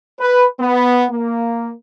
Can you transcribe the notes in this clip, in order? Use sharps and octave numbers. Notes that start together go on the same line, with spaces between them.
B4
B3
A#3